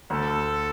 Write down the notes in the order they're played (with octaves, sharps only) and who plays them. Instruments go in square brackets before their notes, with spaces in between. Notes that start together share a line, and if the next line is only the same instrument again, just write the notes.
[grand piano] D2 [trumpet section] A4